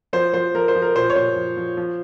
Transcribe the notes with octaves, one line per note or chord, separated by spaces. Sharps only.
F3 C5
F3 C5
F3 A#4
C5
F3
A#4
A#2 C5
C#5
A#2 C5
F3
F3
F3